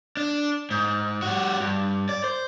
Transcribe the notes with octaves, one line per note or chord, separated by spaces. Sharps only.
D4
G#2
G3 F#4
G2
D5
C5